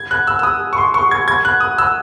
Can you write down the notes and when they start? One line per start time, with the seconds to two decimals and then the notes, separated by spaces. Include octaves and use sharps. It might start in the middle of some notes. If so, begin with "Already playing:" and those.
Already playing: G#6
0.11 F#6
0.27 E6
0.39 E6
0.43 D#6
0.73 C#6
0.78 C6
0.94 C#6
1.11 G#6
1.28 G#6
1.45 F#6
1.60 D#6
1.78 E6